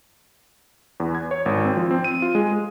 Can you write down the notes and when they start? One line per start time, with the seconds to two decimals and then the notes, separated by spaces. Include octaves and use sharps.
1.00 E2
1.15 G#6
1.31 C#5
1.46 G#1
1.65 C4
1.77 F3
1.91 C4
2.04 D#7
2.22 F4
2.35 G#3
2.53 G#4